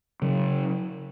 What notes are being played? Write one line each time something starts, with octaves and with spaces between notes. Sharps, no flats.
C#3 F#3